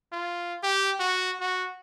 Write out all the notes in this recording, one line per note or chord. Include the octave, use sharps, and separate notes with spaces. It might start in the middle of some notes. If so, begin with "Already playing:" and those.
F4
G4
F#4
F#4